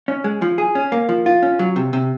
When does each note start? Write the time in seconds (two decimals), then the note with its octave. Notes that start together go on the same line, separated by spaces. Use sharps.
0.08 C#4
0.24 G#3
0.42 F3
0.58 G#4
0.75 C#4
0.92 A#3
1.09 F3
1.26 F4
1.43 C#4
1.59 F#3
1.76 C3
1.93 C3